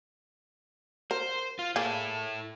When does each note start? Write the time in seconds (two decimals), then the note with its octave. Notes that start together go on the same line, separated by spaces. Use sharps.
1.11 A#4 C5
1.59 F4
1.76 A#3 E4 G#4 A4